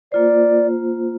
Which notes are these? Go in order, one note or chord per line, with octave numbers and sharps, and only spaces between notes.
A#3 F4 C5 D5